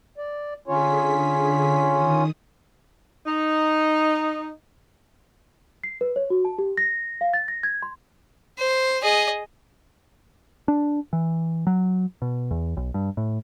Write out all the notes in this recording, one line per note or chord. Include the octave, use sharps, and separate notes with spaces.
D5
D3 C#4 F4 G#4 C#5 B6
D#3 D#6
D#4
C7
B4
C#5
F#4
A5
G4
A#6
F5
A6
A#6
G#6
C6
C5
G#4 D#5
D4
E3
F#3
B2
E2
B1
G2
A2